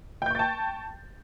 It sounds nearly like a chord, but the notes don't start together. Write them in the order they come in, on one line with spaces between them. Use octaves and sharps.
G5 G6 C#6 A6 A5